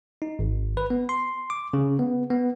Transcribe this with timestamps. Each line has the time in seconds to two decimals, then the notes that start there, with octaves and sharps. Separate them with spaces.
0.22 D#4
0.39 G#1
0.77 B4
0.90 B3
1.09 C6
1.50 D6
1.73 C#3
1.99 B3
2.30 B3